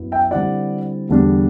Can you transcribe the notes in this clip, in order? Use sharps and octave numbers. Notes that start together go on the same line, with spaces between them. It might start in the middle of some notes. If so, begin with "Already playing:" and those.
Already playing: F#2 F#3 B3 E4
E5 G5
D3 G3 C4 E4 D5 F#5
E2 D3 G3 D4